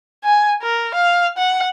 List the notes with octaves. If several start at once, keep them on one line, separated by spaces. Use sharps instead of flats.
G#5
A#4
F5
F#5